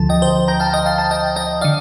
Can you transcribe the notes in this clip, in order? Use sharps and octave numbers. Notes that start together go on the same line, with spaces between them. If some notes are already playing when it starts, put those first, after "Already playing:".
Already playing: D2 D3 F3 A5
D#5 G5
C5 D#5
G5 A#5
F5 A5
D#5 G5
F5 A5
F5 A5
D#5 G5
D#5 G5
D3 D5 F5